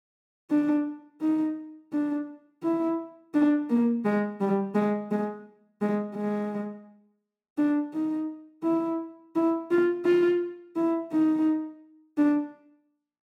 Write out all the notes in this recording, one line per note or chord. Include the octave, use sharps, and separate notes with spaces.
D4
D#4
D4
E4
D4
A#3
G#3
G3
G#3
G#3
G#3
G#3
D4
D#4
E4
E4
F4
F4
E4
D#4
D4